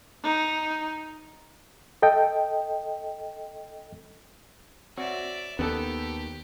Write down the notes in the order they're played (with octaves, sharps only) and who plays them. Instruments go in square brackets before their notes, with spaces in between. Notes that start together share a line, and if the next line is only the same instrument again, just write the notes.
[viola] D#4
[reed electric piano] A4 D#5 G5
[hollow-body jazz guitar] C4 F#4 C#5 [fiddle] D5 E5
[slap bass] D#2 [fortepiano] B3 A4 [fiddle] G4